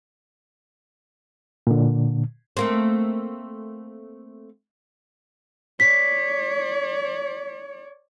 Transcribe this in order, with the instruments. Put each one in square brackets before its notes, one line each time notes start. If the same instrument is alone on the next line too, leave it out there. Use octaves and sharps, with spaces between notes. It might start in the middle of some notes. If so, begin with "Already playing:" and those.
[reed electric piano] A#2 D3
[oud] A3 A#3 C4
[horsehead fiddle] C#5 D5 [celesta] B6